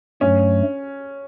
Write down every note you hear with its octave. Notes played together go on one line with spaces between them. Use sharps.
G2 F#3 A3 C#4